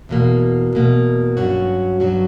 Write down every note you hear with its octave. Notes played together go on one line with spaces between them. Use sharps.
E2 B2 A#3
E2 B2 A#3
G2 F#3 C#4 F#4
G2 F#3 C#4 F#4